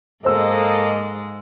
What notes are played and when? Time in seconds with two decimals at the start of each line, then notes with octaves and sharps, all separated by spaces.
0.25 G#2 G#3 A#3 A4 C5 D#5 E6